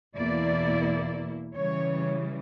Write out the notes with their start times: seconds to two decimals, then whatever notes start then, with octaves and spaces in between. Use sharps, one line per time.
0.15 E2 B2 A#3 E4 D5
1.54 C#3 E3 G3 C#5